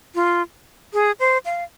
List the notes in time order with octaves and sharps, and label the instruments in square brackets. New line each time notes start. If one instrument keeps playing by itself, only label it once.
[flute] F4
G#4
C5
F5